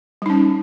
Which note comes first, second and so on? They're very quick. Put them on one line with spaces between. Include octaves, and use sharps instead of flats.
G3 D#4 C#4